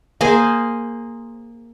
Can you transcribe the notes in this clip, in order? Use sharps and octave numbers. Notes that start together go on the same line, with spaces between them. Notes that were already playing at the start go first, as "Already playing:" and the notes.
A#3 G#4 C5